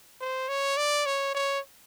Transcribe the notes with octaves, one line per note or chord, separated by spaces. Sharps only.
C5
C#5
D5
C#5
C#5